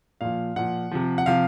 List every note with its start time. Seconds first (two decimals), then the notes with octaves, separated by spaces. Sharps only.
0.21 A#2 F3 F5
0.56 A#2 F3 F#5
0.91 C3 F3
1.18 F#5
1.26 C3 F3 F5